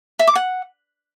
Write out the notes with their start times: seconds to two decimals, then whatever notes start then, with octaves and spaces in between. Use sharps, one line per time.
0.19 E5
0.27 D6
0.35 F#5